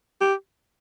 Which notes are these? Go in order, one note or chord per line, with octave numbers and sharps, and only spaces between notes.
G4